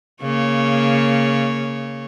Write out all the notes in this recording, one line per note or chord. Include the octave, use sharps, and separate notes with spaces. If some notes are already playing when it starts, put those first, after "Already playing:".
C#3 A#3 C#5